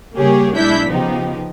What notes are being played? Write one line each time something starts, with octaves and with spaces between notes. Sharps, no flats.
C#3 G3 A#3 G4 G#4 C#5
B1 G#3 D4 E4 G6 B6
C#3 F3 B3 D#4 G4